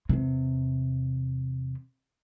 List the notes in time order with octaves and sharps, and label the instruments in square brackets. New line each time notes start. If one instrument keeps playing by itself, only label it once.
[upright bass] E2 C3